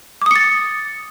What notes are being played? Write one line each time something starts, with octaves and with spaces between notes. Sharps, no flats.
D6 D#6 A6 C#7